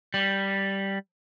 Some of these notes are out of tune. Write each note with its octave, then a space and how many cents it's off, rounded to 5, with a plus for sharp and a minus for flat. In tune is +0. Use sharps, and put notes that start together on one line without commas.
G3 -5